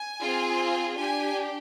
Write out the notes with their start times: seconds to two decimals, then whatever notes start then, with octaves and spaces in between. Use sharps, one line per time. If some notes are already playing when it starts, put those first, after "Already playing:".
Already playing: G#5
0.22 C4 F4 G#4
0.97 D4 G4 G#5